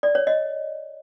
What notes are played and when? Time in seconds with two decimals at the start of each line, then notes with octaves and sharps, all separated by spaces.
0.03 D5
0.15 C#5
0.27 D#5